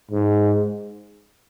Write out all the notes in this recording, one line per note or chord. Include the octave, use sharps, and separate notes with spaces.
G#2